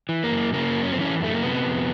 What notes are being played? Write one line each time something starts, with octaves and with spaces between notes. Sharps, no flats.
E3
A#3
F#2
C#3 A#3
F#2
C#4
C4
E3 C#4
F#2 A3
A#3
C3 B3
F2